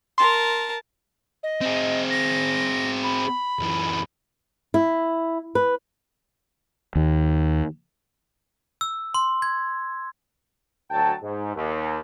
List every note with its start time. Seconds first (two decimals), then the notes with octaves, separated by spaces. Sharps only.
0.18 A#4 A5 C6
1.43 D#5
1.61 C4 G#4
2.10 A#6
3.03 B5
3.59 F#2 E3
4.74 E4
5.55 B4
6.96 D#2
8.81 E6
9.14 C6
9.42 G#6
10.91 D2 F#3 G5 A5
11.22 G#2
11.55 D#2